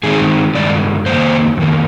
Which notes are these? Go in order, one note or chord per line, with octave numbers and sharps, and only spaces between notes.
G2 D#3 G#3 C4 G#4
G2 D#3 G#3 D5
F2 D#3 A#3 C5
F2 D#3 A#3